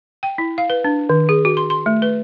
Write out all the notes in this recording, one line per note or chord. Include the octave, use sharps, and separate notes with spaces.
G5
E4
F5
B4
D4
D#3
G#4
F#4
C6
C6
A3
B4